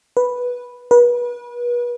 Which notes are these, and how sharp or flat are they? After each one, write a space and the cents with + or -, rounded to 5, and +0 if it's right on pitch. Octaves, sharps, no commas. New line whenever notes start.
B4 -5
B4 -35